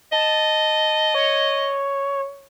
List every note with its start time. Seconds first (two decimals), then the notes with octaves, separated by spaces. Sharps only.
0.12 D#5 A5
1.15 C#5